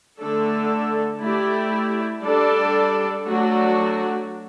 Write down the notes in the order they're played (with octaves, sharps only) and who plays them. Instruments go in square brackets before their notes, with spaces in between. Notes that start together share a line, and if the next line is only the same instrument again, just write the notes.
[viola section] D3 A3 D4 A4
A3 E4 G4 D5
G3 D4 A4 D5
F#3 A3 D4 F#4